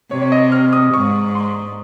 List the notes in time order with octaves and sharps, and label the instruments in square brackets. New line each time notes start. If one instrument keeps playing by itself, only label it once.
[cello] C3 [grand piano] C#5
[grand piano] C#5
D#5
F6
D#6
[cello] G#2 [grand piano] C#6
[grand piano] C6